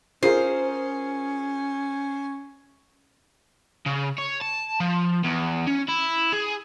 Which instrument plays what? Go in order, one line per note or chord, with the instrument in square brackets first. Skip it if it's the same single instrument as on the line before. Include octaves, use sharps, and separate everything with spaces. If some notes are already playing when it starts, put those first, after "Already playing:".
[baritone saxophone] C#4 [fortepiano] F4 G#4 A#4 [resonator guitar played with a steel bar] C5
[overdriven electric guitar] C#3
C#5
A5
F3
E2
C#4
E4
G#4